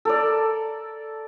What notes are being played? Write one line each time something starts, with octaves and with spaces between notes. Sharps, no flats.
A4 A#4 D5